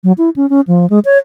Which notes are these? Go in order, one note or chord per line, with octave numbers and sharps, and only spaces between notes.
F#3
E4
C#4
C#4
F3
G#3
C#5